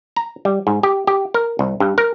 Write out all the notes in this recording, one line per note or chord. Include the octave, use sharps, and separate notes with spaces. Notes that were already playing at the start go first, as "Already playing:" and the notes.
A#5
G3
G#2
G4
G4
A#4
C2
G2
A#4